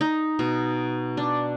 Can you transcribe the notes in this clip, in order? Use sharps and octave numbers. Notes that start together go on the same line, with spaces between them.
D#4
B2
D4